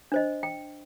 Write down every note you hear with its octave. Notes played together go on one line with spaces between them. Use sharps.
D4 C5 D#5
G5